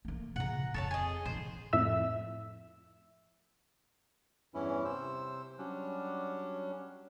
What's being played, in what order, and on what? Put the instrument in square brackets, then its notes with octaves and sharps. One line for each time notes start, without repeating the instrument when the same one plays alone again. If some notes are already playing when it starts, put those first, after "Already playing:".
[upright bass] A3 A#3
[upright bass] A#2 C#3 [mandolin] F#5 A#5
[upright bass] F2 C4 [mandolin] A4 C#5 A5
[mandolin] G#4 D#5
[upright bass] A#2 D#3 [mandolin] C5
[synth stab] F2 A2 E5 E6
[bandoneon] E2 G2 E3 C#4 E4
C3 C5 E6
F#3 G3 C#4 D4